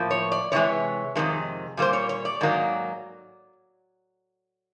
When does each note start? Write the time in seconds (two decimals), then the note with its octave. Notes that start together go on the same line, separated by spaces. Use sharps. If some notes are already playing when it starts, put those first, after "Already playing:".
Already playing: A2 F3 A#3
0.11 C#5
0.32 D5
0.52 C3 E3 G#3 C#5
1.15 F2 C3 D#3 G#3
1.77 A#2 G3 A#3 C5
1.93 C#5
2.09 C#5
2.25 D5
2.41 G#2 D#3 F#3 A#3